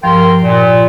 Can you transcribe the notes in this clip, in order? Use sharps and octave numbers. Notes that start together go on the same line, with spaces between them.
G2 F3 A#4 G5 C6
A#2